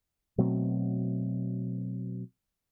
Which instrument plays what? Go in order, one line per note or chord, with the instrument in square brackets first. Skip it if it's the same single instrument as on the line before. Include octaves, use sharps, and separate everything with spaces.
[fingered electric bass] B2 F#3 A3 C4